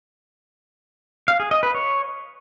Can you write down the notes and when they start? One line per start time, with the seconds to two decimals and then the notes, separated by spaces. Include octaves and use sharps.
1.28 F5
1.40 G#4
1.51 D#5
1.63 B4
1.74 C#5